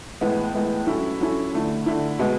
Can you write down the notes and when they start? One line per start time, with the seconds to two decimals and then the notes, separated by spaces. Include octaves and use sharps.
0.21 A2 E3 G#3 B3
0.54 A2 E3 G#3 B3
0.87 F#3 C#4 E4 A4
1.20 F#3 C#4 E4 A4
1.53 D3 A3 E4
1.86 D3 A3 E4
2.19 B2 G#3 B3